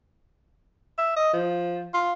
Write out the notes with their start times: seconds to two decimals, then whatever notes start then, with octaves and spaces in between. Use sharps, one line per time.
0.98 E5
1.16 D#5
1.33 F3
1.94 F4